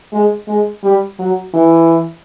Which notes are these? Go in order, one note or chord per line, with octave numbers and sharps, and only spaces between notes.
G#3
G#3
G3
F#3
E3